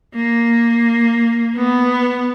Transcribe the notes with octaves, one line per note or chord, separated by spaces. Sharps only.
A#3
B3